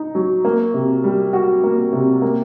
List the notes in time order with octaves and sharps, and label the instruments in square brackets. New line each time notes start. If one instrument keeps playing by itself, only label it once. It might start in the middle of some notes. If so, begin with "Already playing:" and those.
Already playing: [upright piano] D#4
F#3
A#3
C3
G3
F#4
A#3
C3
A#3